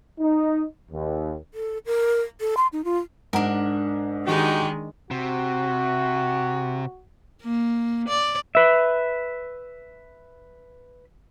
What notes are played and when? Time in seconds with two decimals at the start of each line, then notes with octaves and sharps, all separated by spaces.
0.20 D#4
0.91 D#2
1.54 A4
1.86 A#4
2.41 A4
2.57 C6
2.73 D#4
2.85 F4
3.33 G#2 D4 A#4 F#5 A#5
4.27 D#3 G#3 D#4 F#4 G4
5.11 C3 F#4
7.42 A#3
8.08 D5
8.55 B4 E5